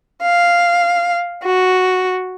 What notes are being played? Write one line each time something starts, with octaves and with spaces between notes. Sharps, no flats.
F5
F#4